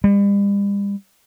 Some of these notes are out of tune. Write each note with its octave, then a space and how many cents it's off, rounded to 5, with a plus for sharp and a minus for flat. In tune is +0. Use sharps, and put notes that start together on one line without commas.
G3 +40